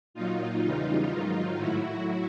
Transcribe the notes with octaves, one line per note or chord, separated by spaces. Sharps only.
A#2 F#3 D#4 F4
E2 C#3 E3 G3 D#4 F4
G#2 D#3 F#3
A2 F#3 E4 F#4